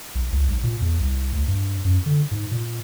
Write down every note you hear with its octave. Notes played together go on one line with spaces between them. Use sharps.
B1
C#2
B1
A#2
E2
C2
D2
G2
F#2
D3
G#2
A#2